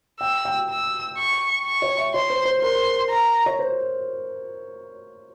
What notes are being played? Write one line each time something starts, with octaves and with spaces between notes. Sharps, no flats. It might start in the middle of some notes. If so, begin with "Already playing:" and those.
G5 E6
G5
E6
C#6
C#6
C#5
E5
C#5 C6
C5
C5
A#4 C6
A#5
C#5
C5